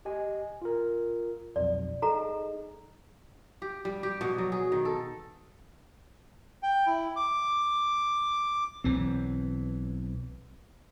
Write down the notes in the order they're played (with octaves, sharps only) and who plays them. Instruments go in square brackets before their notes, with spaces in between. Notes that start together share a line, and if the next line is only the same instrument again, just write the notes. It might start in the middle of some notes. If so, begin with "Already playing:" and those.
[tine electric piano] G4 D#5 G#5
F4 A#4
[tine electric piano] B1 F2 [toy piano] D5
[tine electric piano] D#4 G#4 D#5 [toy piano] A4 A#5
[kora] G4
G3
G4
B2
F#3
G#4
D#3
A4
[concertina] G5
E4
D6
[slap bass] B1 E3 C4